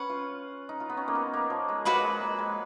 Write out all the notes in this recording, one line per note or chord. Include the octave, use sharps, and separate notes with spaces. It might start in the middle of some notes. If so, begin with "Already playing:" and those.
Already playing: C#4 B4 F#5
F4
D#4
F4
B3
C#4
A#3
B3
A#3
F3
G#3
G#3 F#4 B4 F#5 B5
G#3
A#3
G#3